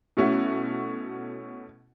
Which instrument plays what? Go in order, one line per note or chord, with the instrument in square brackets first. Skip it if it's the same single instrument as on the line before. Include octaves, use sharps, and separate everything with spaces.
[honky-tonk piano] B2 A3 C#4 E4 F#4